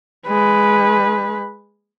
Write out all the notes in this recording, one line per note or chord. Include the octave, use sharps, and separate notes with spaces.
G#3 B4